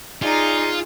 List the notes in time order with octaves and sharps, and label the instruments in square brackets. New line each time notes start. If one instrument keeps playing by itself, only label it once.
[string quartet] D#4 [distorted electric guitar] F4 [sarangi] G#4 [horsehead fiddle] D5 A#5